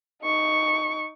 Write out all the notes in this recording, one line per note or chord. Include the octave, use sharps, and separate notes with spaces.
D#4 C#6